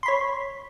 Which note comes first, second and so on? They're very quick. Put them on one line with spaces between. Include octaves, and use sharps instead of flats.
C6 B5 C#5